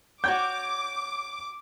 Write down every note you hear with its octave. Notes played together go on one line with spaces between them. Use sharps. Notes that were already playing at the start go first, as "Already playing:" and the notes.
F#4 C#5 G5 D6 G6